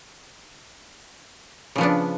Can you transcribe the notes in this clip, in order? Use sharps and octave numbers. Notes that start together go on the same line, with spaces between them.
C#3 F3 B3 D4